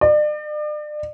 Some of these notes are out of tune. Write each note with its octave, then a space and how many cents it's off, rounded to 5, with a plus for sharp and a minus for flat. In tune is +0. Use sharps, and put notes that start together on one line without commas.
D5 +40